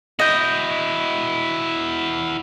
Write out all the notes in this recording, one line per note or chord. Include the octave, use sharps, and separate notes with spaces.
E4 F#4 D#5 G6